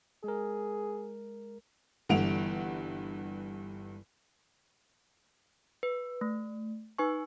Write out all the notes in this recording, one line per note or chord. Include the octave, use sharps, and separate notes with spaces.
G#3 G#4 A#4
G1 G2 E3 F#5 D7 F7
B4
A3
D#4 B4 G#5 C#6